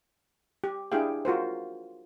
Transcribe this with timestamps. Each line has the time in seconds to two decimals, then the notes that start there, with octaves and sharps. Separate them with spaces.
0.64 G4
0.92 D4 E4 G4 G#4 F5 G5
1.25 F4 F#4 A#4 C5